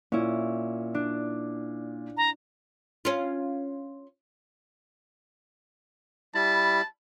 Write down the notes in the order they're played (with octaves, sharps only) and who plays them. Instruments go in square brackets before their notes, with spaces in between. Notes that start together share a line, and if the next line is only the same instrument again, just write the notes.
[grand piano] A#2 [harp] C#4 E4
[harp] D4
[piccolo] A#5
[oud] C#4 F4
[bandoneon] G3 E4 B5 [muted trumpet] A5